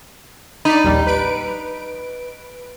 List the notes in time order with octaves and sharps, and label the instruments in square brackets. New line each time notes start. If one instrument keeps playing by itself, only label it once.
[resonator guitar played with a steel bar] D#4 [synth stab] D5 B5
[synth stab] A#1 D#2 G3
B4 D7